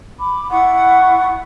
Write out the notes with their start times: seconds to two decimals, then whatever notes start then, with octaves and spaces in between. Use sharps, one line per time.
0.18 B5 D6
0.50 E4 F#5 C#6